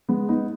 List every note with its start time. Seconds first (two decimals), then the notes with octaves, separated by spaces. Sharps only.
0.09 G#3 B3
0.29 B3 D#4